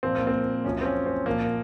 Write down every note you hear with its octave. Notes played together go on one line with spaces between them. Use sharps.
A#2 F3 C4
A#3
C4
F#2 F3 C#4
C4
C#4
C4
A#2 F3 A#3